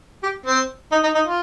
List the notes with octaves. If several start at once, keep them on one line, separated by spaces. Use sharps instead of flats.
G4
C4
D#4
D#4
D#4
F4